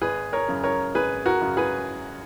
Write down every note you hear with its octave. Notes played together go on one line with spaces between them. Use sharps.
G#1 G#4 B4
A#4 C#5
F#2 C#3
A#4 C#5
G#1 G#4 B4
F#4 A#4
F#2 C#3
G#4 B4